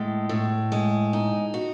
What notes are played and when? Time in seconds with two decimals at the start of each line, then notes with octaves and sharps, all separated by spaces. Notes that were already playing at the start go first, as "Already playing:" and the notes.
Already playing: A2 G#3
0.29 A2
0.72 G#3
1.13 D#4
1.54 F#4